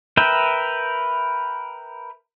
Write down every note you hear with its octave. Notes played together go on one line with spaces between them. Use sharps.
A#4 B4 E5 G5